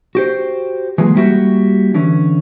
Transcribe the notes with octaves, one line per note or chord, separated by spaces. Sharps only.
F#4 G4 C5
E3 F#3 G#3 A#3 F4
G3 A#3 B3 E4 F#4 G4
D3 E3 C#4